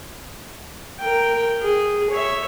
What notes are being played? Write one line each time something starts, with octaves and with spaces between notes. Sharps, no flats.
A#4 G5
G#4
C#5 E5